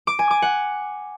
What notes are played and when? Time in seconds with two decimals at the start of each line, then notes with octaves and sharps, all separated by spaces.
0.07 D6
0.19 G#5
0.31 D6
0.42 F#5